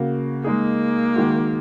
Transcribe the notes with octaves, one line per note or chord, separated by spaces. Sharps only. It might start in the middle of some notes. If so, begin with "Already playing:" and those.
Already playing: C#3 A#3 F#4
G#3 A#3 D#4 G#4
D#3 G#3 F#4